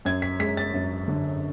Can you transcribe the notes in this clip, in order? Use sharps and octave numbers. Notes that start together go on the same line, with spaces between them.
F#2 G#6
B6
G#3 B6
A6
F#2
D3